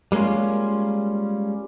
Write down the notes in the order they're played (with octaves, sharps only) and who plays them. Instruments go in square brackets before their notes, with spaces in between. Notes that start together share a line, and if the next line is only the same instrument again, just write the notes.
[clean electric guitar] G3 G#3 A#3 C#4 F4